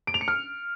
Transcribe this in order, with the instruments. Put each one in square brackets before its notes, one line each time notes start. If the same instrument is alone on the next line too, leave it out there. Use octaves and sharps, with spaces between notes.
[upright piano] D7
F7
C#7
F6